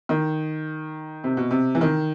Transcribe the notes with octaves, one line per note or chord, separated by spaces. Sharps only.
D#3
C3
B2
C3
E3
D#3